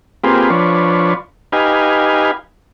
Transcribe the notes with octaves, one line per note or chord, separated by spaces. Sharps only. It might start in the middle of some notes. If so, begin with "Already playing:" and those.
A#3 C4 F4 G4 G#4 B4
F3 D4 B4 C#5
D#4 G4 B4 F5 G#5